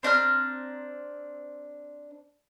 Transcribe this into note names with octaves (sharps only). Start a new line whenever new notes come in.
C4 D4 A#5 F6